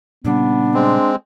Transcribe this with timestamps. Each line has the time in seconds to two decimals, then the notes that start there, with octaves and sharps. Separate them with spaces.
0.25 A#2 C#3 G3 B3 D4
0.74 G#3 C4